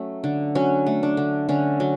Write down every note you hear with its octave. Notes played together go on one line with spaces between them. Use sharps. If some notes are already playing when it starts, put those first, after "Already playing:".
Already playing: F#3 A3 C#4
D3
F#3 C#4
A3
D4
D3
D3 C#4
F#3